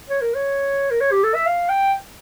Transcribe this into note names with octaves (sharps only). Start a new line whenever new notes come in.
C#5
A#4
C#5
A#4
C#5
G4
A4
E5
F5
G5